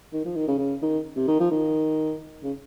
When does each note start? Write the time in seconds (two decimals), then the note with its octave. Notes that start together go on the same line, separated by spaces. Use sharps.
0.13 D#3
0.25 F3
0.36 D#3
0.48 C#3
0.58 C#3
0.82 D#3
1.16 C3
1.28 D#3
1.40 F3
1.51 D#3
2.43 C#3